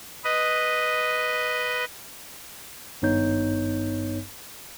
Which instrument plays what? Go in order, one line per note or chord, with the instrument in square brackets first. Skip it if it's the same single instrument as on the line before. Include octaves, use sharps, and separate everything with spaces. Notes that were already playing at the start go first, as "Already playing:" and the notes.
[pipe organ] B4 D#5
[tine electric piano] G#1 G2 B3 D#4 C#5 G6